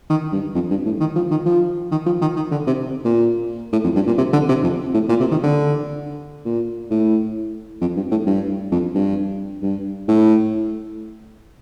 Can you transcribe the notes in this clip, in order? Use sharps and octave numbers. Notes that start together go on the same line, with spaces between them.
D#3
G2
F2
G2
A2
D#3
F3
D#3
F3
D#3
F3
D#3
D#3
D3
C3
A#2
A2
F2
G2
A#2
C3
D3
C3
F2
A2
A#2
C3
D#3
D3
A#2
A2
F2
G2
A2
G2
F2
G2
G2
A2